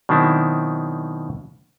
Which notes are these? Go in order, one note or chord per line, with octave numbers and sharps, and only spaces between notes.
B2 D#3 F#3 C4 D4 E4